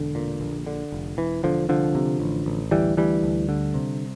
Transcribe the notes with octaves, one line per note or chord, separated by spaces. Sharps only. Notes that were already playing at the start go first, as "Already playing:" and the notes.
Already playing: E1 D3
A#2
A#1
D3
F1
E1 E3
E1 D3 F3
C2 D3 F3
C3
A1
A1
D2 E3 G3
D2 E3 G3
D2
D3
C3